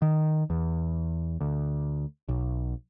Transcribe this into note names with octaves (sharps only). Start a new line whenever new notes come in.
D#3
E2
D2
B1